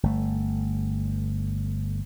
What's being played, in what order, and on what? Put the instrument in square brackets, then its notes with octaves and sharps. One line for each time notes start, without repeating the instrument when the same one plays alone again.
[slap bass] G1 A3